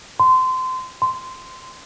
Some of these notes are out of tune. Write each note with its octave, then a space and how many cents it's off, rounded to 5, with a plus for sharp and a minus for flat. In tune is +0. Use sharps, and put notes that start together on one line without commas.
C6 -25
C6 -15